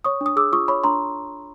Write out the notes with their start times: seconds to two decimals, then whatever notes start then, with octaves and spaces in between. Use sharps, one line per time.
0.04 C#5 C#6 D#6
0.21 D4
0.26 D#6
0.36 G#4 D6 E6
0.52 F4 C#6 D#6
0.68 C#5 B5 C#6
0.84 D4 A#5 C6